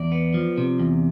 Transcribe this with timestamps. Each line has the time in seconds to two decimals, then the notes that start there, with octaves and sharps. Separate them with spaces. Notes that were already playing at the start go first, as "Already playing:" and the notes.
Already playing: E2 D5
0.12 B3
0.34 F3
0.58 C3
0.80 E2